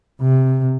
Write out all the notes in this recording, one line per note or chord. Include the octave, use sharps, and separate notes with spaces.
C3